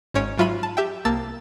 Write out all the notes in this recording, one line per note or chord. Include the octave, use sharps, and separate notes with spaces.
G#1 G#2 C#4 C#5 D7
G#2 F#3 F4 E5 B5 D#7
A5
G4 E5 G5
C2 A#3 A5 E6 A6 E7